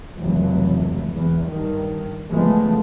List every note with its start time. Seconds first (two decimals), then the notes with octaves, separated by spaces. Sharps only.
0.18 F1 C#2 E3 F#3
1.14 E2
1.46 G2 D#3
2.29 C#3 E3 F3 G#3 A3 B3